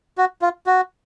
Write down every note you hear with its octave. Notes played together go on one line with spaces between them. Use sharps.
F#4
F4
F#4